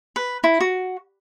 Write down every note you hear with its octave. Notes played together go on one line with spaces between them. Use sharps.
B4
E4
F#4